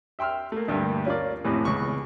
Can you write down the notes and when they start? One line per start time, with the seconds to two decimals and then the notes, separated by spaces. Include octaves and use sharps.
0.19 E5 G5 C6 E6 F6
0.52 A3 A#3
0.68 D2 G2 G3 A#3
1.06 C#4 F4 A#4 D5
1.44 F2 A2 C3 E3
1.65 C#2 B3 C#6